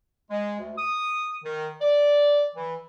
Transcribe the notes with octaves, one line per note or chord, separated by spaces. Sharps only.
G#3
D2
D#6
D#3
D5
E3